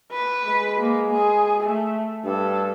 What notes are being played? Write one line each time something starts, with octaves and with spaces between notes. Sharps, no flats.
B4
G#3
A#3
G#4
A3
G2 A4